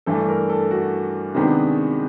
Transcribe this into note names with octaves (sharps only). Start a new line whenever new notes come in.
G2 E3 A3 D4 A4
A#4
A4
F#4
C3 D#3 G#3 B3 D4